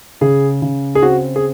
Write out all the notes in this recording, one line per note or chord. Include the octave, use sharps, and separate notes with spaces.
C#3 G#4
C#3
G#4
C4 F#4
G#4